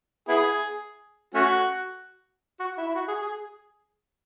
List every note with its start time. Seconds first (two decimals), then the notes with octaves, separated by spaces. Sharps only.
0.28 B3 E4 G#4
1.34 A3 C#4 F#4
2.60 F#4
2.78 E4
2.88 E4
2.95 F#4
3.08 G#4
3.21 G#4